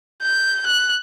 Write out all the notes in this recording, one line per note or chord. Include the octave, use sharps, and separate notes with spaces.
G6
F#6